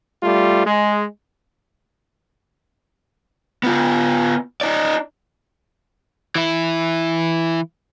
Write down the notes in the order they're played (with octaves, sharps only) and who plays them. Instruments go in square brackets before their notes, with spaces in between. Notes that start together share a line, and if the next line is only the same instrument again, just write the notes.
[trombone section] G3 A3 F4
G#3
[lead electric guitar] B3 F4
D#4 D5
[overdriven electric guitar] E3 E4